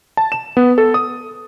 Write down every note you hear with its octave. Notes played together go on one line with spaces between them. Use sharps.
A5
E7
B3
A4
D#6